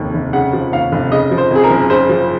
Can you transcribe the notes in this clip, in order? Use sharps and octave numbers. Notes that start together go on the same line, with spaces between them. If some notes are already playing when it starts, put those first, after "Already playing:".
Already playing: F1 D#2 C#3
F1
C#3 F#5
F3
D#2 F5
F1
C#3 D#5
F3
C5
F2 G#4
A#4
F#1
C#3 C5
F3